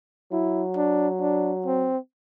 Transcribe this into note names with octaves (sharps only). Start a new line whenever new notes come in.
F#3 E4
D4
D4
C4